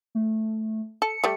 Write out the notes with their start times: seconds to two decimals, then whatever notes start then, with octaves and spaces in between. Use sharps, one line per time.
0.15 A3
1.02 A4 C#7
1.24 G3 A3